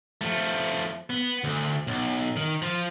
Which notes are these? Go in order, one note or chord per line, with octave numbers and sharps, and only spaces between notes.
F3 A3
B3
D2
B1
D#3
F3 F4